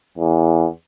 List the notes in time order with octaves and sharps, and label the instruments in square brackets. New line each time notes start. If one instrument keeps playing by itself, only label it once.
[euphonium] E2